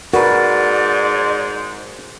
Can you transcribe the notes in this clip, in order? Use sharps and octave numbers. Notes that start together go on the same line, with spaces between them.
G#2 F#4 A#4 B4 D5